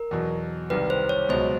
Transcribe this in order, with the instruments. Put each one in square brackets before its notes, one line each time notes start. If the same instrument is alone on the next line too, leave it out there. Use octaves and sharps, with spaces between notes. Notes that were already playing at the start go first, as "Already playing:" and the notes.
Already playing: [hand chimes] A#4
[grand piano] E2 B2 F#3
[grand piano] C2 C3 D#3 [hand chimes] B4
[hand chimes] C5
C#5
[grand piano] C#2 B2 F#3 [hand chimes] C5